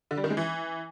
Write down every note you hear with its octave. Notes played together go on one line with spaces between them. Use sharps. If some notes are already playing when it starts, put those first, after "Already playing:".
D3
G3
D#3
G#3
E3